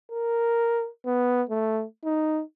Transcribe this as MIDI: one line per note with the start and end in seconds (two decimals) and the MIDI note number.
0.11 0.88 70
1.06 1.43 59
1.50 1.85 57
2.04 2.42 63